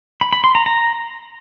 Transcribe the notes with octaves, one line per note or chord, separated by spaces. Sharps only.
B5
B5
C6
A#5
A#5